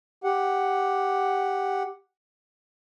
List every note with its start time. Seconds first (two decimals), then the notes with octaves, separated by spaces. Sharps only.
0.24 G4 F#5